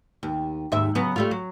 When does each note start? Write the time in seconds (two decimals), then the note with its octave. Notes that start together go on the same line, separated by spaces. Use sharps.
0.23 D#2
0.72 D#2 G#2 E5
0.95 C#3 F#3 B3
1.16 G3 A3 F4
1.31 F#3